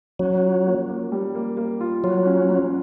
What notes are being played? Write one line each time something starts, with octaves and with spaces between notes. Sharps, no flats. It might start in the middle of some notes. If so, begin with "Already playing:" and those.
F#3 C#4
F4
A#3
A#3
G3
A#3
A#3
F4
F#3 F4
C#4
C#4